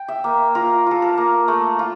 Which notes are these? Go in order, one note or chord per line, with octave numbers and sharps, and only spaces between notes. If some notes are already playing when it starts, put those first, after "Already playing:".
Already playing: G5
E5
A#3
F4 A#4
F4 A4
A#4
A#3
A3 A4
F4